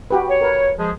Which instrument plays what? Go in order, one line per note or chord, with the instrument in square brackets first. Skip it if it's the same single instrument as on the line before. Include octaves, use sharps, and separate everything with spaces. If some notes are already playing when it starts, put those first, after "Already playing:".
[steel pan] F#4 G4 B4
[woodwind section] C#5
[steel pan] A#4 B4
[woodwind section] F3 G#3 G#4